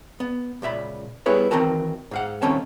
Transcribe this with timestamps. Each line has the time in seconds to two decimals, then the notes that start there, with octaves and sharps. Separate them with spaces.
0.20 B3
0.62 C#2 A#2 E5 B5
1.26 G3 B3 E4 G#4 B4 C#5
1.51 D#3 E3 C4 F#4 A#4 A5
2.11 G#2 F5 F#5
2.42 D#3 A#3 C4 C#4 A4 A5